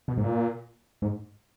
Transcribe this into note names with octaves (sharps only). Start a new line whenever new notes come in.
B2
G#2
A#2
G#2